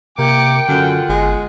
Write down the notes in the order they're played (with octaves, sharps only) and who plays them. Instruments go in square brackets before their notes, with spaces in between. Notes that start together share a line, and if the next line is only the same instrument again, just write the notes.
[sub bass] C3 [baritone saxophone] A#3 [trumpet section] G5 [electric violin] D6 C#7
[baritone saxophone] F#2 [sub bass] D3 [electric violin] F4 F#5
[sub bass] G1 [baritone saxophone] G#3